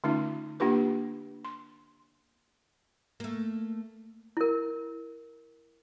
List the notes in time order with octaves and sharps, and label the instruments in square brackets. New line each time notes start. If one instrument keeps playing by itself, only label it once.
[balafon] D3 A3 C#4 D#4 F4
A#3 D4 F4 G4 B4
C6
[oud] A3 A#3
[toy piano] E4 A#4